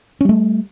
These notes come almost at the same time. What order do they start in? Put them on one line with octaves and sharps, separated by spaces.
C#4 G3 A3